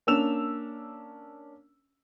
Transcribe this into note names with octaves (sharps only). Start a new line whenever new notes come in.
A#3 C#4 D4 E6 E7 F7